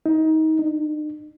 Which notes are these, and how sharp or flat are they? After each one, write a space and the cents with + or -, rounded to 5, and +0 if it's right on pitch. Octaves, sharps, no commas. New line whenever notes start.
D#4 +25
D#4 -45